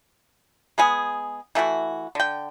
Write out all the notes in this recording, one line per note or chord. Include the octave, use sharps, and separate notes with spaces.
G#3 B3 G#4
E3 A3 E4 F#4
D3 G5